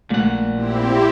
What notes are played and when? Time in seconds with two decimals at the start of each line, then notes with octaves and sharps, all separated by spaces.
0.10 A#1 A#2 G#3 A3 F#5
0.53 C4 E4 G4